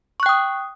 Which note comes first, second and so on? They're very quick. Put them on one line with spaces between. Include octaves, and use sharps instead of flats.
C#6 F#6 G5 D#6